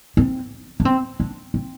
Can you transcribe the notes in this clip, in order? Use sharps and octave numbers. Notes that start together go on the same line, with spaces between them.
C4
D4
C4
D4
C4